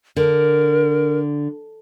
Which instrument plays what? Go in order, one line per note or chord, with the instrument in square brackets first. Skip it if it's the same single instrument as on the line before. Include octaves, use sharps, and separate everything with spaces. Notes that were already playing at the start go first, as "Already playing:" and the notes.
[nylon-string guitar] D3 [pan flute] A#4